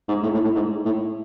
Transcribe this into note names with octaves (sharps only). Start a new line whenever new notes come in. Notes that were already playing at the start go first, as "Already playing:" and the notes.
G#2
A2
A2
A2
G#2
A2